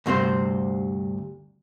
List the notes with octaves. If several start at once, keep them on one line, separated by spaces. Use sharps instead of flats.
D2 G2 C3 C4 C5